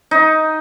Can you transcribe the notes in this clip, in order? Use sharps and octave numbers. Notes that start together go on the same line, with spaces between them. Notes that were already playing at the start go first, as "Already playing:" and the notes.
D#4